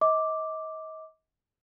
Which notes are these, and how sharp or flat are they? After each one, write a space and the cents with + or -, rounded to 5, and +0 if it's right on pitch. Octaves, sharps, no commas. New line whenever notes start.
D#5 +35 D6 +0